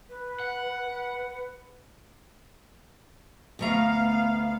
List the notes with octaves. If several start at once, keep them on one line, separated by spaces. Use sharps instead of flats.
B4
F#5
B4
B4
D2 A3 B3 F5 A#5